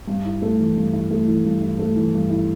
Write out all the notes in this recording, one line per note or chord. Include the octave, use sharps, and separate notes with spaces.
G2
E4
A3
E3
G2
E4
A3
E3
G2
E4
A3
E3
G2
E4